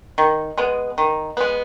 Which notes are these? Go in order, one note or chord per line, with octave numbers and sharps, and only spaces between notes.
D#3
G#3 B3
D#3
G#3 B3